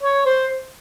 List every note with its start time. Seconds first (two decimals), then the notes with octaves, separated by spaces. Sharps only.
0.03 C#5
0.26 C5